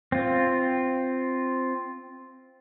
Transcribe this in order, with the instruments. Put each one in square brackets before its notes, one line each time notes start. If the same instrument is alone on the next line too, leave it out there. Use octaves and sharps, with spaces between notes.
[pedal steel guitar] C4 F4